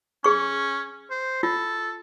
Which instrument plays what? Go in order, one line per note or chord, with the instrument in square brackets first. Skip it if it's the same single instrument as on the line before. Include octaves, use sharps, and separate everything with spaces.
[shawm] C#4 [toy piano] G#4 C#6
[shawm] C5
[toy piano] F4 [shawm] A4